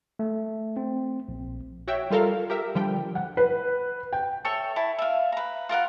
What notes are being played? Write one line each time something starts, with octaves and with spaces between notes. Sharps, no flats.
A3
C4
A#1
F#4 C#5 E5 G5
G3 F4 A4 A#4 F5
G4 A#4 E5
D3 F3 G3 G5
F#5
B4
G5
A4 C#5 E5 G5
E4 A5
E5 F5
B4 A#5
F4 A#4 F5 F#5